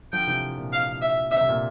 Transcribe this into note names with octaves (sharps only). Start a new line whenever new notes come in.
D3 F3 G5
C3 E3
A#2
F5
E5
D3 E5
C3
A#2